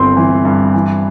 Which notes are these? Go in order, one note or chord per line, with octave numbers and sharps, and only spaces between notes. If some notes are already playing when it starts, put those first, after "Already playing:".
Already playing: G1 G2 C4 C6
E3
G2
E3